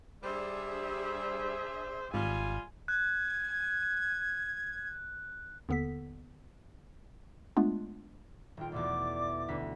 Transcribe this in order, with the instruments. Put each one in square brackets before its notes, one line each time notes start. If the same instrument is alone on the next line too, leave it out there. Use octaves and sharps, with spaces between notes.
[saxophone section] G3 [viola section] D4 G#4 E5 [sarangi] C5
[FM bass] G#1 [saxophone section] G3 F4 [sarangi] G#5
[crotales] F#6 [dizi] G#6
[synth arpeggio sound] D#2 D3 B3 A4 B6
G#3 A3 B3 D4 F4
[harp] D#1 F4 [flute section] G5
[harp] E2 B2 A3 [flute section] D5 D6
[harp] D2 B2 B6